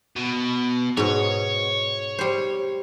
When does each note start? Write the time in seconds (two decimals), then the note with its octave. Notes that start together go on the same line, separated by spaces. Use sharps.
0.16 B2
0.97 G#2 B2 C#5
2.19 G3 C5